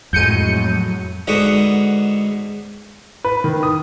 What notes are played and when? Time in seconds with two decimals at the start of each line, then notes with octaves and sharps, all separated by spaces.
0.13 F2 A2 F#3 G#3 G6 C#7 D#7
1.27 G#2 D3 B3 F#4 D#5
3.24 B4
3.44 D#3
3.63 D#6